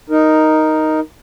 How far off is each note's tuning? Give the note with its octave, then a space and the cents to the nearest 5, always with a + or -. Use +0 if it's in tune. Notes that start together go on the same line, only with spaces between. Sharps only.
D#4 +0 A#4 +0